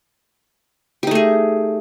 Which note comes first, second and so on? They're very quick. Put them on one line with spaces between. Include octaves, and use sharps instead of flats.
G4 D#4 A3 G#4